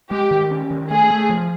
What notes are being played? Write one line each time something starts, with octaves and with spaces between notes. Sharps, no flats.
G#3 G4
D#3
C#4
D#3
A3 G#4
A3
F3